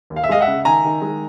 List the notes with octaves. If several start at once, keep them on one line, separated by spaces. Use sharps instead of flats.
D#2
F5
E5
G#3 D#5 F5
E5 F#5
C#3
D#3 G#5 A#5
D#3
G#3